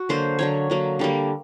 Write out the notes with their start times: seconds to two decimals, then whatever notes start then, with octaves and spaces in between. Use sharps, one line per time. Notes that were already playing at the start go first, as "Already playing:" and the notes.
Already playing: F#4
0.09 D3 F#3 A#3 C5
0.39 D3 F#3 A#3 C#5
0.70 D3 F#3 A#3
0.99 D3 G3 A#3